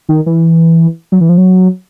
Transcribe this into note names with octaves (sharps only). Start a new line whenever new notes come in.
D#3
E3
F#3
E3
F3
F#3